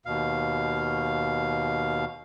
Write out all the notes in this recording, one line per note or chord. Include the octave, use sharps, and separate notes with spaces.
D#2 B2 F5